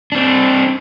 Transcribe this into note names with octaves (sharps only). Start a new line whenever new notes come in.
C4 D4